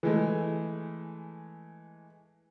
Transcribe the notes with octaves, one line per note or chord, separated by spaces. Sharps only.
E3 G#3 A3